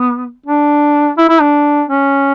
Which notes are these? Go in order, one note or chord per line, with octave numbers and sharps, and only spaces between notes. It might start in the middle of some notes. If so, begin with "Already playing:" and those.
Already playing: B3
D4
E4
E4
D4
C#4